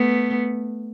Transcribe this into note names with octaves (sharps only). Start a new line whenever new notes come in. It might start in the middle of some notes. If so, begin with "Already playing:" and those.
Already playing: A3 B3